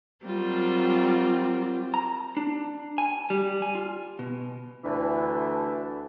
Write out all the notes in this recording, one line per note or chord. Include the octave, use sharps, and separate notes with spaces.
F#3 G3 C4 F4 A#4
A#5
D4
G#5
G3
G#5
F4
B2
D2 E3 D4